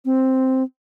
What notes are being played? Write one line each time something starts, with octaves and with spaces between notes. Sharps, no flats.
C4